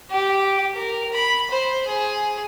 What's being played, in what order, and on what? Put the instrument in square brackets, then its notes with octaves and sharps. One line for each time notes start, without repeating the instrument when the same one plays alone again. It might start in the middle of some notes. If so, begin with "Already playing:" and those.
[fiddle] G4
A#4
B5
C5
G#4